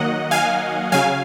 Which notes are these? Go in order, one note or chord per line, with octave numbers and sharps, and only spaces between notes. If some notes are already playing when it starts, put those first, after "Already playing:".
Already playing: D#3 F#3 A#3 D#5 F#5
F5 G#5
C#3 F#3 F5 G#5